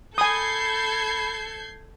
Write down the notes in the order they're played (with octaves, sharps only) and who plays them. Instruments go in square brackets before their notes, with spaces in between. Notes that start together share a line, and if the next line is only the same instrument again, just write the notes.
[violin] A4 [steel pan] G#5 D#6 [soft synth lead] B5 [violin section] G6 G#6 C7